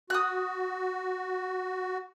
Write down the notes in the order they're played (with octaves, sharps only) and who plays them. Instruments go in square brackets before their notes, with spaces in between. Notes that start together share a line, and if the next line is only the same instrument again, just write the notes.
[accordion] F#4 [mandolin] D#6 F#6